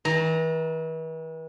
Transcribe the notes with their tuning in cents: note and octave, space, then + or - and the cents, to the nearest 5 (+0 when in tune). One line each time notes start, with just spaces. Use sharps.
E3 -40 A#5 +0